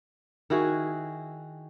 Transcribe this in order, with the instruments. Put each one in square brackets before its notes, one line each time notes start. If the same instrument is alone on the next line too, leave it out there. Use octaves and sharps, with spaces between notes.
[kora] D#3 E4 F#4 G#4